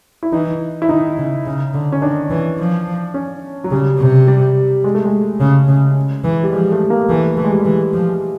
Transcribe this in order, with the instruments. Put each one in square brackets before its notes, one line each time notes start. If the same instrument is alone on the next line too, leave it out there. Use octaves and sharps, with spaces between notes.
[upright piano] E4
[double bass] E3 [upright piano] D#4
[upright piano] E4
[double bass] D#3 [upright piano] D#4
[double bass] C#3
C#3
D3
[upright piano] C#4
[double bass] D#3 [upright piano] D4
[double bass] E3
F3
[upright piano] C#4
F#3
[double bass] C#3 [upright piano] G3
[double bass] C3
[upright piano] G3
G#3
A3
G#3
[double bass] C#3
C#3
E3
[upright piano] G3
[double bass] F3 [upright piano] G#3
[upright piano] A3
A#3
[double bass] E3 [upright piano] A3
[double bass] E3 [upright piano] A3
[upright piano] G#3
G3
G#3
[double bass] E3
F3